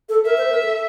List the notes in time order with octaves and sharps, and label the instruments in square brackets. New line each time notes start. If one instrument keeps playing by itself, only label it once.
[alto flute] A4
[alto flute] A#4 [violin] E5
[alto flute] C5
A#4
A4